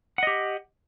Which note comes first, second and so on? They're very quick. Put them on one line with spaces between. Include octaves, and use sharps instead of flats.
F#5 D#5 G4